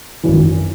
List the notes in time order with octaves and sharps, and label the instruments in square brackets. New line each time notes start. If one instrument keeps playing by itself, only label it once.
[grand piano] G#1 F#2 E3